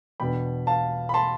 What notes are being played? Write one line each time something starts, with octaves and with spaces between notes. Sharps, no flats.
E2 B2 B3 D4 G5 B5
F5 A5
B5
A5 C6